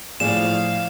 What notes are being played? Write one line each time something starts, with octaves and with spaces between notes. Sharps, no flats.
A2 F3 G#4 D5 F5 E7